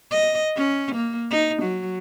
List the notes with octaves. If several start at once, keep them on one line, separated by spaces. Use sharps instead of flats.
D#5
C#4
A#3
D#4
F#3